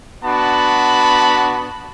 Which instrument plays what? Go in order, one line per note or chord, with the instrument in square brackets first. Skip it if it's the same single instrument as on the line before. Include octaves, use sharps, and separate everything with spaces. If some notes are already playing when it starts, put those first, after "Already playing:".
[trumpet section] B3 D4 F#4 A5 B5